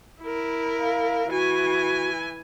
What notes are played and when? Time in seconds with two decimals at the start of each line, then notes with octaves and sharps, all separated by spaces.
0.22 E4 A#4
0.78 F5
1.30 E3 F#4 G#5